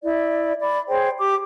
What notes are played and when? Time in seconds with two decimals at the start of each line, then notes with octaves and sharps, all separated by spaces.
0.04 E4 D5
0.61 D5 B5
0.89 G#4 C5 C#5 G5
1.19 G4 D6